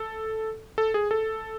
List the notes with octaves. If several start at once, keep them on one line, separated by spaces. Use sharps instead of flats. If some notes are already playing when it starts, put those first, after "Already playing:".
Already playing: A4
A4
G#4
A4